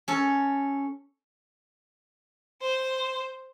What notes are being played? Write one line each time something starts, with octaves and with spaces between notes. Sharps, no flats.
C#4 A4
C5